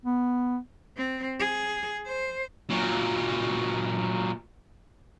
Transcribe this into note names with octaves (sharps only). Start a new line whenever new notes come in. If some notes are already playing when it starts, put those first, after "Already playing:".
B3
C4
G#4
C5
A#2 F#3